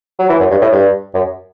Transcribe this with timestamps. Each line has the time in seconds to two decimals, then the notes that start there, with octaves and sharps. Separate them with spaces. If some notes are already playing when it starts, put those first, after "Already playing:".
0.19 F#3
0.29 E3
0.39 F#2
0.50 G2
0.61 A2
0.72 G2
1.14 F#2